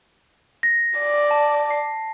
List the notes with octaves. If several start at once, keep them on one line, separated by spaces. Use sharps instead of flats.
A#6
D5
A5
C7